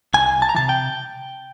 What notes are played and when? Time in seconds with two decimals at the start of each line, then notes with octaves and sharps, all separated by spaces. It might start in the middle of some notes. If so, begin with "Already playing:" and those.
0.14 C2 G#5
0.42 A5
0.49 A#5
0.55 C3 E3 A5
0.69 G5